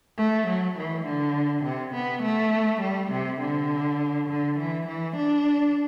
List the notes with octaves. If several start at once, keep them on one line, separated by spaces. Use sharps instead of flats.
A3
F#3
E3
D3
C3
B3
A3
G3
C3
D3
D3
E3
E3
D4